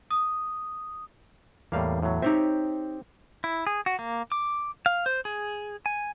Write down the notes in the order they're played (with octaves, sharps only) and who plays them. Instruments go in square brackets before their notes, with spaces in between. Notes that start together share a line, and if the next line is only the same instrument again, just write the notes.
[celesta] D#6
[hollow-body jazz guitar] E2 F5 [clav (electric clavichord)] A2 G3 A#3
[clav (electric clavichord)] A2 F#3
[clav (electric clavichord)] C4 G4 [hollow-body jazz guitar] D#4 C#5 E5
[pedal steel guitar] E4
G#4
F#4
A#3
D6
F5
C5
G#4
G#5